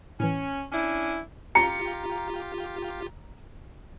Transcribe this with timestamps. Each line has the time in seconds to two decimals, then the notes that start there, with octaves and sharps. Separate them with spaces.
0.20 A2 E3 C#4
0.72 C#4 D4 E4
1.55 F4 G4 A#5 C#7